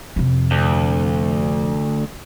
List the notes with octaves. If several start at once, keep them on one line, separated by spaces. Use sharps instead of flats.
F2 C3
D2